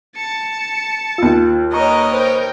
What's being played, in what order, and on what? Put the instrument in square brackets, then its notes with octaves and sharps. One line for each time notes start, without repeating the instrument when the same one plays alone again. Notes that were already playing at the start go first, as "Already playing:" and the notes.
[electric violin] A5 C#7
[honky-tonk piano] D#2 E6 [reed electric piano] F4
[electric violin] A#4 [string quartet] B4 C#5 D#5 [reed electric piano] A#5 C#6
[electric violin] A#4 G5 [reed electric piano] C5